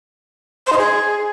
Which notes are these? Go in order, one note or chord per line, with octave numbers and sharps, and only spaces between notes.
C5
D#4
G#4